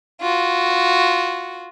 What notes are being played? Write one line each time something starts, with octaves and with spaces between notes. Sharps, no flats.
F4 F#4